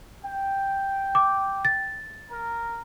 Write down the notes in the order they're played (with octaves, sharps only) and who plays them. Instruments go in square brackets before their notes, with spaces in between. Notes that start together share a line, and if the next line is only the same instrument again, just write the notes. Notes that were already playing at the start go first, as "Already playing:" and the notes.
[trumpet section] G5
[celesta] D6
A6
[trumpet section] A#4